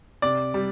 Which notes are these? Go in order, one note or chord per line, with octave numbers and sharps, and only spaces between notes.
C3 D5
G3